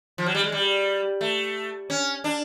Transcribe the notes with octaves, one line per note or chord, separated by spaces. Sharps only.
F3
F#3
G3
G#3
G3
A3
C#4
D4